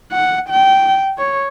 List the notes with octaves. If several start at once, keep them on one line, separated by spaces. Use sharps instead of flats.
F#5
G5
C#5